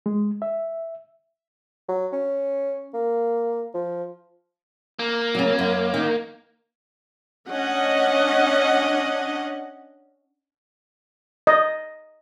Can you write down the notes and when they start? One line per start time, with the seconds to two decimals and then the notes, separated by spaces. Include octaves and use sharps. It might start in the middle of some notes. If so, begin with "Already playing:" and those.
0.06 G#3
0.42 E5
1.89 F#3
2.13 C#4
2.94 A#3
3.74 F3
4.99 A#3
5.35 C#3 F#3
5.59 F#2
5.94 D#3
7.49 C#4 D4 D#5 F#5
11.47 D#5